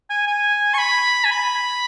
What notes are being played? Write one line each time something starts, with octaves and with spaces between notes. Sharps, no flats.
G#5
G#5
C#6
B5
G#5
B5